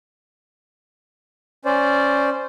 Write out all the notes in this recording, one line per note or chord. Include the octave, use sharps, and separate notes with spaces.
C#4 C5 D5